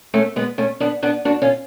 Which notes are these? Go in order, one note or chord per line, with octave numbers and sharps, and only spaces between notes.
A3 C#4
G#3 B3
A3 C#4
B3 D4
B3 D4
D4 F#4
C#4 F4